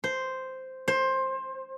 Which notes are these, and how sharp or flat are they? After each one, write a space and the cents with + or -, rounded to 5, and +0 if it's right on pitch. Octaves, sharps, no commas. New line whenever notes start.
C5 -5
C5 +15